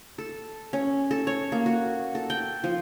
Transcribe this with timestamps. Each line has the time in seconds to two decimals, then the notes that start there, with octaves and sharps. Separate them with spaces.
0.18 A4
0.73 C#4
1.11 A4
1.27 C#5
1.52 A#3
1.66 F#4
2.15 A4
2.30 G5
2.64 F3